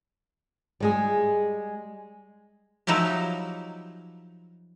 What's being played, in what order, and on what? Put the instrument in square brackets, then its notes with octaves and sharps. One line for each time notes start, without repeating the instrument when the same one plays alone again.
[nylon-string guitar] G3 G#3 G#4
[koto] F3 F#3 D#4 E4 G4